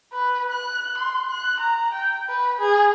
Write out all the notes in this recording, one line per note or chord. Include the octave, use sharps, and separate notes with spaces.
B4
F#6
C6
F#6
A#5
G5
B4
G#4